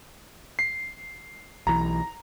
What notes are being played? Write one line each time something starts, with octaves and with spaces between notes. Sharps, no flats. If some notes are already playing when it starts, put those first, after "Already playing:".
C7
B1 E3 A#5